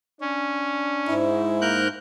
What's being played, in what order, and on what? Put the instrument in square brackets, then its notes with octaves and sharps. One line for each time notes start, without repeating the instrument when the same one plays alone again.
[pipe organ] C#4 [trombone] D4
[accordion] G#2 [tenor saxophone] E4
[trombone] A#3 [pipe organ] A#4 F#6 G6